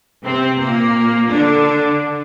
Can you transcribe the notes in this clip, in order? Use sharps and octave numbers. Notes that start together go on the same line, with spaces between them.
C3 C4
A#2 A#3
D3 D4